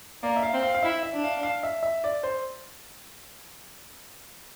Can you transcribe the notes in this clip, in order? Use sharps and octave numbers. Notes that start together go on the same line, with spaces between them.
A#3 D5
E5
F5
C4
F5
F5
E4 E5
E5
D4
F5
F5
E5
E5
D5
C5